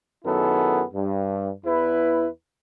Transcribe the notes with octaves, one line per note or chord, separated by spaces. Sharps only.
F#2 D#3 B3 E4 G#4 A4
G2
E2 E4 B4